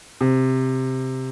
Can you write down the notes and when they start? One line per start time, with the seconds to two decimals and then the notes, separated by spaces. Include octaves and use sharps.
0.21 C3